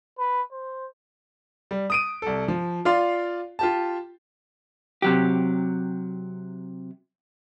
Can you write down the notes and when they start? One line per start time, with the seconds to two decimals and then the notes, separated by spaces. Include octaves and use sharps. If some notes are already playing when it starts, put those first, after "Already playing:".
0.18 B4
0.52 C5
1.71 G3
1.90 D#6 D7 D#7
2.22 C2 A4
2.48 F3
2.85 F4 D5 F5 C6
3.59 F4 G4 A5
5.02 C3 F#3 G4